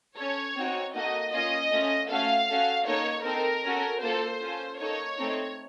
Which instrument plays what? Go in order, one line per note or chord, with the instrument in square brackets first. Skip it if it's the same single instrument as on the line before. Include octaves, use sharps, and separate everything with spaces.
[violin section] C#4 A4 C#5
C4 D#4 F#4
A#3 D#4 F#4 A4 D#5
A#3 C#4 F4 D#5
A3 C#4 F4
A3 C#4 F#4 A4 F5
C#4 F#4 A4
A#3 D#4 A4 C#5
C4 D#4 A4 A#4
C#4 F#4 A4
A#3 F4 A4 C5
C#4 F4 A4
A#3 D#4 A4 C#5
A3 C4 D#4 A4